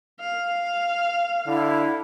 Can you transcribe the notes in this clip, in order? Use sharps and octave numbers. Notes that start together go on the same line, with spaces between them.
F5
D3 E4